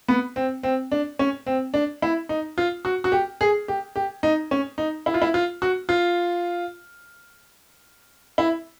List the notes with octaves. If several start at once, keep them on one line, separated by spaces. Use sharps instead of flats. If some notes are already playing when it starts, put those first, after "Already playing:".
B3
C4
C4
D4
C#4
C4
D4
E4
D#4
F4
F#4
F#4
G4
G#4
G4
G4
D#4
C#4
D#4
E4
F4
E4
F4
F#4
F4
E4